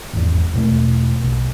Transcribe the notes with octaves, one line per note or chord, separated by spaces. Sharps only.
G#1 E2
E2 B2 A3
B1